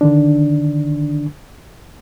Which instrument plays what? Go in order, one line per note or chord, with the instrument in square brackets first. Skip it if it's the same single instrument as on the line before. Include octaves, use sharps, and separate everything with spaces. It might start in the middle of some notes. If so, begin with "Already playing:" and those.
[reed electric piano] D3 D#3 D4